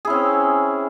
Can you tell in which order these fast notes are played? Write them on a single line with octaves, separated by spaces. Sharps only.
G#4 E4 C#4 C4